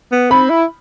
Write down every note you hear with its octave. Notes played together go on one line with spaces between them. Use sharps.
B3
C4 B5
E4